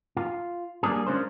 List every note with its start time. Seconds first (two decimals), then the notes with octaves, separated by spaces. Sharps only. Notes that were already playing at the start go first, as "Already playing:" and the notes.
0.17 F4
0.83 G3 A#3 D4 G#4
1.07 G#3 C#4 D4 F4 A#4 C5